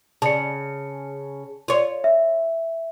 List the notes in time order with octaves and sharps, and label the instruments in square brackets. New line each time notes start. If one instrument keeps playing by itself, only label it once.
[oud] C#3 [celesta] A5 C#7
[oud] F4 C#5
[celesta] E5